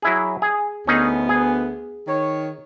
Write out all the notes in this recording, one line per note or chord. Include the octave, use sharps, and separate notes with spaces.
F#3 E4 G#4
G#4
D2 B3 C#4 D#4 G#4
G#4
D#3 C#5